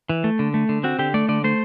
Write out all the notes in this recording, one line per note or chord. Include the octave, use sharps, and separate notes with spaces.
E3
A3
D3
A3
D3
C4 F#4
D3 G4
A3 D5
D3 D5
A3 C5